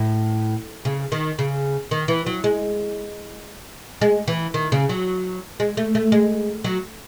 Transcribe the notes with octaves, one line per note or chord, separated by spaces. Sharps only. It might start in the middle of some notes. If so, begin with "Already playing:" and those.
Already playing: A2
C#3
D#3
C#3
D#3
E3
F#3
G#3
G#3
E3
D#3
C#3
F#3
G#3
A3
A3
G#3
F#3